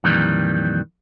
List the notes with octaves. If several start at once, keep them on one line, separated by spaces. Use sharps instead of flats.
F2 A#2 D#3 E3 G3